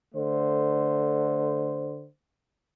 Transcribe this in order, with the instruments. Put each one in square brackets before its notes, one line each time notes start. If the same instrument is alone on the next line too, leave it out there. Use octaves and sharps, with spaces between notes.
[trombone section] D3 A3 C5